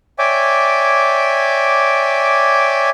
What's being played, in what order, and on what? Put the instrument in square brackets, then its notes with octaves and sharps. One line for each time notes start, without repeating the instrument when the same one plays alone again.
[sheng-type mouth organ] C#5 D5 E5 G5 G#5 D6